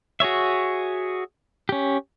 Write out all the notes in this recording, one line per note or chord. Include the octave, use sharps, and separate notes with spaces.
F#4 G#4 C#5 E5
C#4 G4